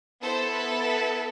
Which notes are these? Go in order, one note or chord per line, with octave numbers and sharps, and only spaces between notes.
B3 E4 A4 C5
B4
B4